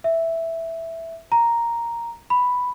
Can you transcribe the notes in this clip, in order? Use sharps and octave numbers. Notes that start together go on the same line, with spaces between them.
E5
A#5
B5